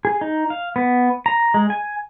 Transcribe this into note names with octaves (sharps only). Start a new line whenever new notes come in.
G#4
D#4
F5
B3
A#5
G#3
G#5